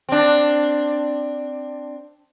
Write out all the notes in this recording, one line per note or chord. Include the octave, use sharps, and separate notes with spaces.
C4 D4